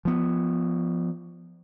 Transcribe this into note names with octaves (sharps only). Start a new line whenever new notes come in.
F3 B3